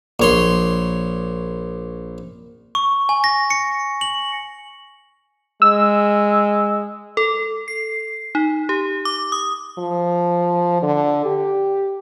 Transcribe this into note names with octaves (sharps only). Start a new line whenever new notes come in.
A#1 C#5 C6
C#6
G#5
A#6
C#7
F#7
G#3 E6
A4
C7
D#4
G4
D6
D#6
F3
D3
G4